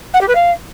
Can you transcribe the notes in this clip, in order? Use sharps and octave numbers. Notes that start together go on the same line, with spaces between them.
F#5
G4
B4
F5